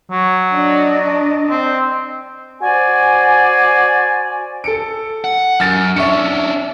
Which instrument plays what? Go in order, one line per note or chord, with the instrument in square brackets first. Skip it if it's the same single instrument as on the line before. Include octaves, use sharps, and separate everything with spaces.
[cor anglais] F#3
[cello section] D4 D5 D#5
[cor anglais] C4
[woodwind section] F#4 C5 D5 G#5
[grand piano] A4 C#7 D7
[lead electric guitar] F#5
[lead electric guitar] F#2 [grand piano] F6 A6
[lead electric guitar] C#4 D4 [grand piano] E5 C#6 C#7